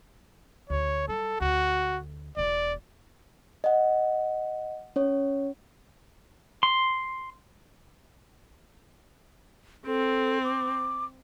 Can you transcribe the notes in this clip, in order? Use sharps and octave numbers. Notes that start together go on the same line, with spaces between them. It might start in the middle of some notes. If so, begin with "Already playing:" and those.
D2 C#5
G3 A4
D2 F#4
E1 E2 D5
D#5 F#5
C#4 C#5
C6
C4 A4
D6